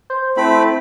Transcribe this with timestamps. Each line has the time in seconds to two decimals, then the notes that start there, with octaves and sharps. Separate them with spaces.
0.10 C5
0.37 A3 C4 E4 B5